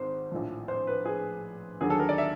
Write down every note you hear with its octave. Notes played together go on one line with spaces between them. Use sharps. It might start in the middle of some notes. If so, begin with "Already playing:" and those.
Already playing: G#1 G#2 C5
A#1 A2 F3
C5
B4
G#4
D#2 D3 F#3 G#4
A4
A#4
D5
E5